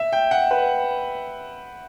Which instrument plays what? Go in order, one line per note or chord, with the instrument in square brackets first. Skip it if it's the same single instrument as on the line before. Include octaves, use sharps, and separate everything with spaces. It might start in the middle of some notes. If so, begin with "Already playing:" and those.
Already playing: [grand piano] E5
G5
F#5
B4